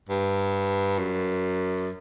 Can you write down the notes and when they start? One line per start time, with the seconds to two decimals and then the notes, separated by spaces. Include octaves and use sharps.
0.09 G2
0.99 F#2